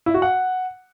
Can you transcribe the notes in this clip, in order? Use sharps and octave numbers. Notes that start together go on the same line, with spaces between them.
E4
F#4
F#5